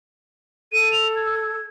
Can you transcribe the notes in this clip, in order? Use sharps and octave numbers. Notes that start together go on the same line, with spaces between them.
A4 D#7
F7
G#6